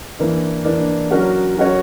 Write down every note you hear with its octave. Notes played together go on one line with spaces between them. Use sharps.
E3 A#3 D4
E3 A#3 D4
F#3 C#4 F#4 A#4 C#5
F#3 C#4 F#4 A#4 C#5